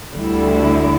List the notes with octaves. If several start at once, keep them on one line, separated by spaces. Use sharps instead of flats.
D2 D3 G3 E4